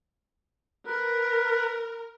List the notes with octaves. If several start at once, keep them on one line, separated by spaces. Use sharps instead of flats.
A#4 B4